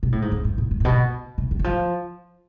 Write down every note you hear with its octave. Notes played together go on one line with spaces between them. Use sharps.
B2
A2
G#2
F2
A2
B2
G#2
A2
B2
C3
D3
E3
F3